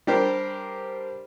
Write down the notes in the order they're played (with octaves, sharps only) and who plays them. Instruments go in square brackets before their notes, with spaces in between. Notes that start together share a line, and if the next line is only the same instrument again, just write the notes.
[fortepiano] G3 D4 G4 A#4 C5